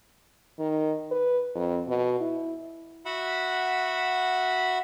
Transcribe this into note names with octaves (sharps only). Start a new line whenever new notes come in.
D#3
B4
F2
B2
E4
F#4 E5 F#5 B5